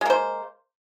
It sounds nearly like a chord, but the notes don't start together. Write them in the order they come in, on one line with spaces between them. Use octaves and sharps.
G#3 A#3 C5